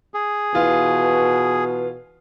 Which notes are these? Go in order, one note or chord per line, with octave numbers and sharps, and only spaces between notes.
G#4
B2 E3 F4 B4 F5